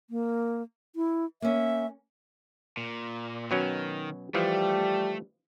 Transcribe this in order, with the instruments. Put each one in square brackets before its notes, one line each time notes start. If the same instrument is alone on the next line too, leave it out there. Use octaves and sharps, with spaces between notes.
[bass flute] A#3
E4
[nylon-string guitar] A#3 C#4 [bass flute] E5
[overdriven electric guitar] A#2
[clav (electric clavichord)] B2 F#3 C#4 [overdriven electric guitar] D#3
[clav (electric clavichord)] E3 F3 [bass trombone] G3 [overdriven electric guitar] A3